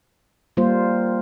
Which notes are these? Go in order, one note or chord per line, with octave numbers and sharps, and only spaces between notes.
G3 A#3 F4 C5